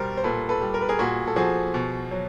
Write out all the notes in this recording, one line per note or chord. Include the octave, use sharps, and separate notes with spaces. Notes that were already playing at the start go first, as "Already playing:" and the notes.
Already playing: B2 G3 A#4 C5
C5
A#2 A4 B4
A4 B4
G3
A#4
B4
G#4 A#4
A#2 F#4 G#4
A4
F3 F#4 G#4
B2
F#3